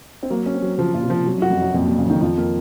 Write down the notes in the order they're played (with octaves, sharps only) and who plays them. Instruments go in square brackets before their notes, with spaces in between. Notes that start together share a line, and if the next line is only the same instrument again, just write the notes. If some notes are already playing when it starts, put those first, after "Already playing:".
[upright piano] C4
[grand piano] F#3 [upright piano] A#3
[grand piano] C#4
[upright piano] C4
[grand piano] F#3
[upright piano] C#3 [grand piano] F3
[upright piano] A#2 [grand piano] F4
[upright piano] C3
[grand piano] F3
[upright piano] C3 [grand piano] F#3
[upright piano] F#2
[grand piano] F#4
[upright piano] F2
[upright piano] F#2 [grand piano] F#3
[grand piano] F2 [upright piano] A#2
[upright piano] A#2
[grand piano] F#3
[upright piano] C#3
[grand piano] F2 [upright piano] D#3
[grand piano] F2 [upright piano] F3
[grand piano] A#3